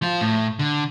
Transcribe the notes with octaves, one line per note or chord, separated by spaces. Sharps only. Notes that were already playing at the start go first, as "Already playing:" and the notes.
F3 F4
A2
D3